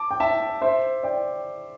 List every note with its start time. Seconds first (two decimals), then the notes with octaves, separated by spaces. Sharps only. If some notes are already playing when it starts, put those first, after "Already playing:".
Already playing: A5 D6
0.11 G5
0.20 E5 A5
0.62 C5 E5
1.03 D5 G5